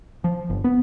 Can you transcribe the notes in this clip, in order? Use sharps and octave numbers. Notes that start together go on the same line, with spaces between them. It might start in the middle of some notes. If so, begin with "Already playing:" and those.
F3
G1
B3